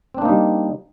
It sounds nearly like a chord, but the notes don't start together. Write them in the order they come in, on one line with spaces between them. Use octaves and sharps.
C4 D4 A#3 D#4 G3